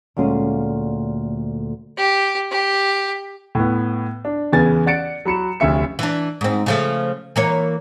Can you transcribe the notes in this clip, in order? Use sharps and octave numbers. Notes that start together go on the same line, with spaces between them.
D2 A#2 G#3 C#4 F5
G4
G4
A2 B3
D4
E2 C#3 B4 G#5 A6
D5 F#5 A6 C#7 D7
F#3 B5 C#7 E7
F1 D2 C#4 E5 C#7
E3 D4
G#2 C4
C#3 F3 A3
E3 A#3 C#5